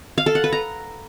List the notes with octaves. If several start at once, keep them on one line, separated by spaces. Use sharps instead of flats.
F5
A4
F#5
B4
A#5